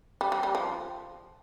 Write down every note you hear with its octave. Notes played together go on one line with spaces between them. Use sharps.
G3
G3
G3
F3